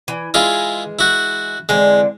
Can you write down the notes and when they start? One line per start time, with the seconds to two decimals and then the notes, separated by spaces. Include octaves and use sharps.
0.08 E3
0.34 E3 G#3 E4 F4 G#4
0.99 E4 F#4
1.69 D3 E3 G#3 C4